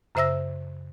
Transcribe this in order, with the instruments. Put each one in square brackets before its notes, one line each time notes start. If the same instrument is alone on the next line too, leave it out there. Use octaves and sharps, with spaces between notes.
[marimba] F#2 C#3 C5 E5 E6 A#6